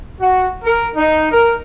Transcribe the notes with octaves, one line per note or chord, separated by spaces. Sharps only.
F#4
A#4
D#4
A#4